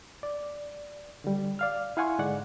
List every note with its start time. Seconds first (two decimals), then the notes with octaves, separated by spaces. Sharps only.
0.23 D5
1.24 D3 G3
1.59 D5 F5 F6
1.97 E4 F5 F#5 G#5 C6 C#6
2.18 G#2 D3 G#3 D5 F#5